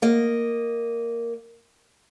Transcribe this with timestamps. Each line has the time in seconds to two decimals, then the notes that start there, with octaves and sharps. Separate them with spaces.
0.02 A#3 D#5